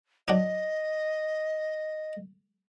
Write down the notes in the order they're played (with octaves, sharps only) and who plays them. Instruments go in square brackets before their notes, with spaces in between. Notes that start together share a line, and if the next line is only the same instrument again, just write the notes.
[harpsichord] F#3 D4 D#4 [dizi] D#5